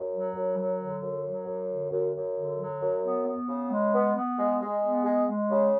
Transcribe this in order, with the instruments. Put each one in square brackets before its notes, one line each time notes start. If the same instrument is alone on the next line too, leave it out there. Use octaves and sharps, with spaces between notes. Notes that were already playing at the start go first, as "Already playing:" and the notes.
Already playing: [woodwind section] F#2
F#3
F#2
F#3
D3
F#2
F#3
F#2
D3
F#2
F#2
D3
F#3
F#2
B3
B3
C#3
G#3
B3
B3
G#3
G#3
B3
G#3
G#3
C#3